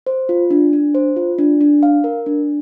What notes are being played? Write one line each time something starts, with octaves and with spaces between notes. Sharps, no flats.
C5
F4
D4
D4
C5
F4
D4
D4
F5
A#4
D4